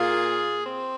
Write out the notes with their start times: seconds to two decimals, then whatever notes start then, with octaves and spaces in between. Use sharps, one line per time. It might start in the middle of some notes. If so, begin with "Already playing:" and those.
Already playing: A#2 A#3 F4 G#4
0.66 C4